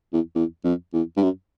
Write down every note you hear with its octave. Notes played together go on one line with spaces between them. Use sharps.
E2
E2
F2
E2
G2
F#2